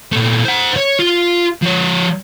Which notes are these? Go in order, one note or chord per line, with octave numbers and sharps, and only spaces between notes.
A#2 A3
C5 F#5
C#5
F4
F3 C#5